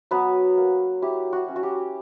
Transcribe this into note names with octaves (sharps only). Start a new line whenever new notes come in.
F#3 B3 B4
A#3
E4 G4
F#4
C#4
F#4
G4